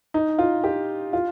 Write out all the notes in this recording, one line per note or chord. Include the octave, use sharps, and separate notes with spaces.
D#4
F4
G4
F4